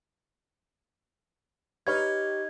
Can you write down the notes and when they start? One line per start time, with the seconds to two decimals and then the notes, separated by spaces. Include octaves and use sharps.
1.87 D#4 G4 B4 C#5 F6 G#6